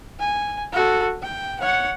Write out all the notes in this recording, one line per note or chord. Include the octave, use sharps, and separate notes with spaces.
G#5
F#4 A4
G5
C#5 F#5